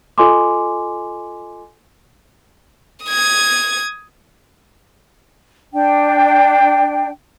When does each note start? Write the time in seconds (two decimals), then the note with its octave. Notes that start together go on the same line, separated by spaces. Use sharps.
0.18 F4 A4 D#5 G#5 C6 D6
3.05 D#6 G#6
5.73 D4 G5